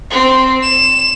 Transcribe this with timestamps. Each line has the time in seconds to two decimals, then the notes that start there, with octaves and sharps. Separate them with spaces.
0.10 C4
0.63 E7